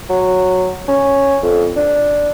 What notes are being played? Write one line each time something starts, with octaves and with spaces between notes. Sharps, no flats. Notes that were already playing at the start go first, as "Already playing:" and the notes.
F#3
C#4
F2
D4